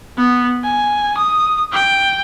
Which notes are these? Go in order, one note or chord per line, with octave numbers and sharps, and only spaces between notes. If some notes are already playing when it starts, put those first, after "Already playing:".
B3
G#5
D#6
G5